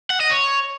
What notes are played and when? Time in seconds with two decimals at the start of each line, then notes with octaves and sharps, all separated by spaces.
0.10 F#5
0.20 D#5
0.31 C#5